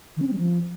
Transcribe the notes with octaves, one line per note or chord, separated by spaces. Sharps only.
D#3
C#4
C4
G3
F3